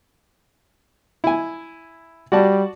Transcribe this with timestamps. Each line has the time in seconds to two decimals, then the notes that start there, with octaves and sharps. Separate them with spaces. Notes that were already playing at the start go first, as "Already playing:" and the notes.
1.24 E4 G#5
2.32 G3 F#4 D5 A5